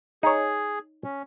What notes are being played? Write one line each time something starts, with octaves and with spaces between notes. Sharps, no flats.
D#4 G#4 C#5
C#4